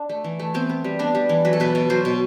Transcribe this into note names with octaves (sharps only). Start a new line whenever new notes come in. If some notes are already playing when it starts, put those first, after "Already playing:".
Already playing: D4
A3
E3
A3
B3 C4
B3
G3
B3 D4
G3
E3
F#3 B4
A4
B2 B4
B2
F#3 C5
B2